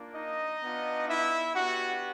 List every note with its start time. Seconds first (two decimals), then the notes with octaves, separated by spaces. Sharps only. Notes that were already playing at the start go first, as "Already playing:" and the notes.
Already playing: A#3 D4 F4
0.14 D#4 D#5
0.61 B3 D4 F4
1.08 E4 E5
1.55 B3 D4 F#4 G4 F#5